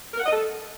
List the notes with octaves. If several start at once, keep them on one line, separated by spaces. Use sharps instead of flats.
A#4
F#5
D#5
A4